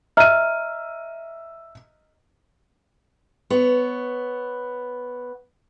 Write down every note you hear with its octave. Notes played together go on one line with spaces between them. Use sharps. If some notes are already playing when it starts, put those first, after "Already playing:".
D#5 E5 A#5 F6 D#7
B3 C#5